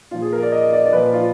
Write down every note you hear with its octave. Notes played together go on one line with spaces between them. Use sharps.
A#2 F3 F4
G#4
A#4
D5
D#5
D5
D5
A#2 F3 B4
F4